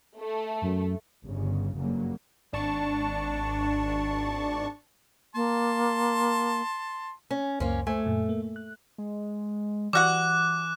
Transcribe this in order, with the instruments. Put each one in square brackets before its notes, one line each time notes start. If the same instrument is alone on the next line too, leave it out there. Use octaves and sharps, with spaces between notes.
[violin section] A3
[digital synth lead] F#2
[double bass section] G1 C#3
F#1 G2 C#3 F#3 A#3
[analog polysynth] G#1 D4 A5 C#6
[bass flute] A#3 [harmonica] A5 C6
[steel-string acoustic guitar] C#4
[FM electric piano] C#2 F#2 C5 [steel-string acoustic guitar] A#3 C#4
[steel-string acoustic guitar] A3 [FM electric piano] C5 G#5
[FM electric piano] F#2 A#2
A#3
F#6
[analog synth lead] G#3
[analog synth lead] E3 [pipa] G3 F#4 F#5 [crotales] D6 F#6